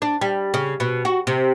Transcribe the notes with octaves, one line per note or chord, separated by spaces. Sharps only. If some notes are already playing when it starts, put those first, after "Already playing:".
D4
G3
C#3
B2
F#4
C3